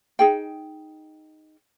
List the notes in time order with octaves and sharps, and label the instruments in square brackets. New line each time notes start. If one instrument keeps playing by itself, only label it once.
[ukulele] D#4 G#4 G5